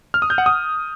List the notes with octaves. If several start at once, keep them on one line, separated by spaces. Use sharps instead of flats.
F6
D#6
G6
F#5
D#6